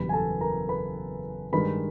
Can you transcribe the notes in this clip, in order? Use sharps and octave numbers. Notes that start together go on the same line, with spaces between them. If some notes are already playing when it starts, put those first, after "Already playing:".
Already playing: F#1 E2 B2 G3 B4 B5
G#5
A4 A5
A#4 A#5
B4 B5
G2 D#3 G#3 B4 B5